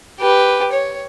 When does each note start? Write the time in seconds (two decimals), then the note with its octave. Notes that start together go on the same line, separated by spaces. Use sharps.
0.20 G4 B4
0.72 C#5